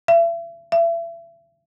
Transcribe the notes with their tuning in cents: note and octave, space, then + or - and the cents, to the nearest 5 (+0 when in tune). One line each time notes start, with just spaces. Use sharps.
E5 +40
E5 +35